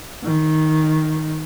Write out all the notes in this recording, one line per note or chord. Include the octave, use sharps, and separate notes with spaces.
D#3